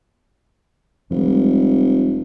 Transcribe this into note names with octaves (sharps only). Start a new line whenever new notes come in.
F1 F3 G3 G#3